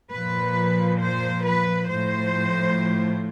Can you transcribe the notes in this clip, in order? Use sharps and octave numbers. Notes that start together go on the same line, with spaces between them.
A#2 F3 B4
C5
B4
A2 F3 C5